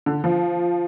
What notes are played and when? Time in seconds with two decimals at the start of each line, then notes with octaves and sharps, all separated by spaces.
0.06 D3
0.24 F3